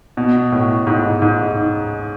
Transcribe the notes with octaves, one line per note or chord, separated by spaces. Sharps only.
B2
A2
G#2
G#2